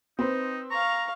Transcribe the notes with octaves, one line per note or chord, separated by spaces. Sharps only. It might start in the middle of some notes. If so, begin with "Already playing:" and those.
C4 D#4 B4 C5
F5 A#5 C#6